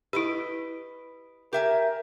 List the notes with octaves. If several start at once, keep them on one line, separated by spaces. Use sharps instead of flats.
E4 G4 B4 D#5
G4 A#4 E5 G#5